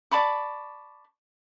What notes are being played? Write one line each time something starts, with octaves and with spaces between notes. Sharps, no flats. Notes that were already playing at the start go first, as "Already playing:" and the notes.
D5 A5 B5 C#6